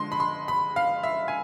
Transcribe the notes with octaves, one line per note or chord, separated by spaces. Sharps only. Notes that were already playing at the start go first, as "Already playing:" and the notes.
Already playing: D3 F3 G#3 C6
B5
C6
B5
F5
E5
G#5